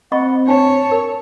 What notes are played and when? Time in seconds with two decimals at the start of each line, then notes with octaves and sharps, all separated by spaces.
0.12 C4 D#5 F#5 B5 C#6
0.48 D4 C5 C#5 A5
0.91 A#4